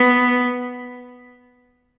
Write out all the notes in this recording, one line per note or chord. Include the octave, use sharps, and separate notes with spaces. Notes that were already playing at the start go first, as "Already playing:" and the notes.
Already playing: B3